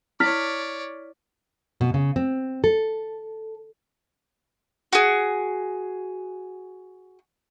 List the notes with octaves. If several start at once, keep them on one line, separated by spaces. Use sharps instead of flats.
E4 C#5 D5 F6 B6
B2
C#3
C4
A4
F#4 G#4